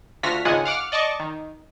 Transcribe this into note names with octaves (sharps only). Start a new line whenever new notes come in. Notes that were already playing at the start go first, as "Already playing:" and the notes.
D2 F4 F#4 F6 A#6 B6
G#1 C#2 G#3 F4 F#5 G#5
F5 F#5 D6 F6
D5 D#5 A5 C#6 D6
D#3